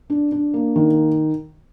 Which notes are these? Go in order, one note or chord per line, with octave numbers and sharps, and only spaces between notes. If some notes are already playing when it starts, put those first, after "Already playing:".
D4
D4
A#3
D#3